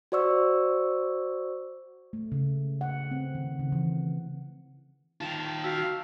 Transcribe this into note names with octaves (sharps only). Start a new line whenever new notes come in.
F#4 C5 D5 C#6 E6
A3
C#3
F#5
C4
D#3
C#3
E3
D#3 F4 A5 E7 F7
F#4 F5 E6 B6